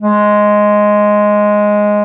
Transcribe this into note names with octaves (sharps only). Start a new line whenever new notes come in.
G#3